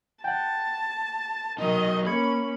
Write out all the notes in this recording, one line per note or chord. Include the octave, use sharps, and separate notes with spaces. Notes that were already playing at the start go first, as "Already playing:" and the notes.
F#5 G5 A5
D#3 F#3 D#4 D#5
A#3 C#4 B5 G#6 C#7